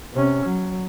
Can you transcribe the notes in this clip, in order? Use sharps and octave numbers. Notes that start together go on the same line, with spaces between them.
C3 C#4
F#3